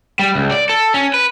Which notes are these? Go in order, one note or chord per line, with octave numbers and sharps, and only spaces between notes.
G3
C#2
D5
A4
C#4
B4